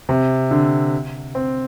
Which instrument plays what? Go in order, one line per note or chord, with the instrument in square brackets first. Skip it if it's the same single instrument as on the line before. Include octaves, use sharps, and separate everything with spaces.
[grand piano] C3
D3
C4